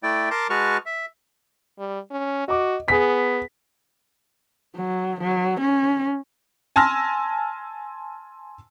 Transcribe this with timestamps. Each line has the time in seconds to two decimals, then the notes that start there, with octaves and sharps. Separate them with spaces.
0.03 A3 E4 D5 G5
0.31 A#4 A5 A#5 C6 D6
0.50 G#3 F#4 B4 A5 C#6 F6
0.86 E5
1.79 G3
2.11 C#4
2.48 F#4 D#5 D6
2.88 B3 G#4 B6
4.76 F#3
5.21 F#3
5.61 C#4
6.76 G#5 A5 C6 E6 F6 A#6